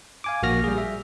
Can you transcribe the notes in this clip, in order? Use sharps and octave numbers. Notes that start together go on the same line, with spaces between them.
F5 G#5 D6
A#1 A#3 F#4 F6 A#6
G3 G#4
E5